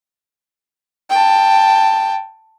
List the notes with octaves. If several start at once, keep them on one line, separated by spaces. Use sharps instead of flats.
G5 A5